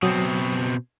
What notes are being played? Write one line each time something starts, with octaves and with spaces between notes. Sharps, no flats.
B2 F#3 C4 D#6